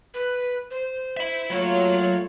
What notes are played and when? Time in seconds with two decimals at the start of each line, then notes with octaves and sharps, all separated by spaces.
0.14 B4
0.71 C5
1.17 E5 B5
1.50 F#3 A3 A#3 F4 C#5